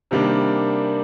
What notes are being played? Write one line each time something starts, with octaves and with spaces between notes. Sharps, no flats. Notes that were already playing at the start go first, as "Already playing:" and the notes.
C3 D#3 G3 A#3 D4